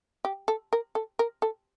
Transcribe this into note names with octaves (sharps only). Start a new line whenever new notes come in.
G4
A4
A#4
A4
A#4
A4